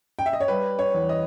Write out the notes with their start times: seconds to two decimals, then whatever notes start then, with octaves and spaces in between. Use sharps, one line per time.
0.19 G5
0.26 E5
0.33 D#5
0.40 C#5
0.48 G3 B4
0.79 C#5
0.94 E2
1.09 D#5